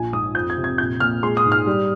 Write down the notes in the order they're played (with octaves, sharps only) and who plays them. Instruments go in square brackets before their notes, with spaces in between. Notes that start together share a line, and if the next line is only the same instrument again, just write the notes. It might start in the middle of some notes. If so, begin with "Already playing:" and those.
Already playing: [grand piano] A#1 G#5
G#2 D#6
F2 G6
G#6
C3
G#6
A#1 G6
A#2 F6
G#3 C6
D#6
G#2
F6
G3